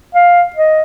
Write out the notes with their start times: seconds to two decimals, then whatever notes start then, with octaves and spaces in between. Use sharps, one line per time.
0.15 F5
0.56 D#5